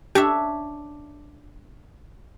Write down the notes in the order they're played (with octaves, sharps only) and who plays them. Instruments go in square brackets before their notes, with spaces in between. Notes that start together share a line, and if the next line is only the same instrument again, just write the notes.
[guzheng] D4 C#5 E5 [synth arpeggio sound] G4